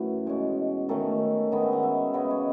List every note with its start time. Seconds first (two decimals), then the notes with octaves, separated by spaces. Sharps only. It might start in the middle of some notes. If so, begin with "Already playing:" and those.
Already playing: F#2 E3 A3 F#4
0.26 B2 G#3 C#4
0.89 D#3 A3 C#4 A4
1.52 D#3 G#3 B3 D#5
1.63 E5
1.73 F#5
1.83 E5
2.14 C#3 G#3 B3 D#5
2.31 C#5